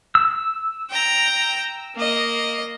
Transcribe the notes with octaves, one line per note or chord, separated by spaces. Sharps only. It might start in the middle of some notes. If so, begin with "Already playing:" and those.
E6
G5 A#5
A#3 D#5